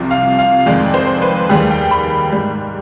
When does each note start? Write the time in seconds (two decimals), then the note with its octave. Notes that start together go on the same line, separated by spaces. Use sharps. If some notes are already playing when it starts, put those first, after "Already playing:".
Already playing: C2 C3 F3
0.11 F5
0.39 F5
0.66 F2 D#3 G#3 D5
0.94 C5
1.22 B4
1.49 D#2 D#3 G3 G#4
1.70 G5
1.91 B5
2.32 G#2 G3